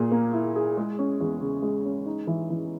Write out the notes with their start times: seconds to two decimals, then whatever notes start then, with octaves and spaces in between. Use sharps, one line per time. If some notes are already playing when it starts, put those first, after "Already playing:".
Already playing: A#2 G#4
0.12 A#3
0.33 E4
0.56 G#4
0.77 G#3
0.99 C#4
1.21 E2
1.41 C#3
1.63 G#3
1.85 C#4
2.06 D#4
2.27 E3
2.50 E3